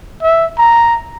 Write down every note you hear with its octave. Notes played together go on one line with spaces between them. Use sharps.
E5
A#5